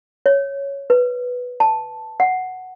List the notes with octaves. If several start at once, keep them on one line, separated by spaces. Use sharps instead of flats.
C#5
B4
A5
F#5